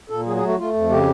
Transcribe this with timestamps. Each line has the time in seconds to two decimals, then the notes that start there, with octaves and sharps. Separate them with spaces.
0.10 A#2 A4
0.26 F#3 G#4
0.37 G#4
0.43 A3
0.48 F#4
0.58 A3 F4
0.74 F2
0.90 C#3 G4